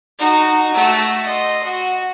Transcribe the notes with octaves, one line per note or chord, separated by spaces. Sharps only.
D#4 F#4
A3 F#4
D#5 C6
F#4